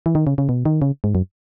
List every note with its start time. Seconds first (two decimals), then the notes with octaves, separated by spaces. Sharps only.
0.06 E3
0.15 D#3
0.27 C#3
0.38 C#3
0.49 B2
0.65 D#3
0.82 C#3
1.04 G#2
1.15 F#2